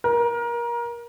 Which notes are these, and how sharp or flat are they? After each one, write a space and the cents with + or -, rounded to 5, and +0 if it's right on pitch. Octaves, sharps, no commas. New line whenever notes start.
A#4 +25